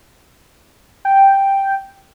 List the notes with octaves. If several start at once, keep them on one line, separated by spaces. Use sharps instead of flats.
G5